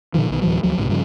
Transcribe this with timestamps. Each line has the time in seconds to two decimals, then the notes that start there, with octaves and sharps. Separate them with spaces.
0.14 A#2 D3 D#3 F3
0.30 B1 D#3
0.42 D2 A2 E3 F#3
0.63 D2 F3 F#3
0.78 B1 G#2 C3
0.89 G2 C#3 F3